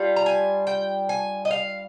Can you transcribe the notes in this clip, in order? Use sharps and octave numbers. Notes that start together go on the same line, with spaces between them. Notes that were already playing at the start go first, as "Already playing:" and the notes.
Already playing: G3 D4 F4
A#5
G#5
G5
G#5
D#5
F5